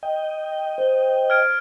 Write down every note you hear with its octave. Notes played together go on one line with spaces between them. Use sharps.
D#5 G5
C5
F6 G#6 D7